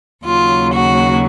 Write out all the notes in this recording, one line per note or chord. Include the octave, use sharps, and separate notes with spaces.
D#2 C#3 F#3 F4
F#4